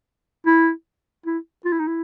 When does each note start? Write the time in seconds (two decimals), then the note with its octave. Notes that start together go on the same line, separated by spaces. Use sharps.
0.46 E4
1.26 E4
1.65 F4
1.73 E4
1.79 D#4
1.87 E4